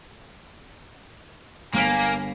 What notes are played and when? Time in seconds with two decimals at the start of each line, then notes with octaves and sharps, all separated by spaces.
1.74 G1 A#3 G#5 F6 B6